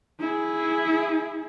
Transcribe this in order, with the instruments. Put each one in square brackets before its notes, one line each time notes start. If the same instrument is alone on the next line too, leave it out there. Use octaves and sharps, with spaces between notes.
[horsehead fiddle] E4 G#4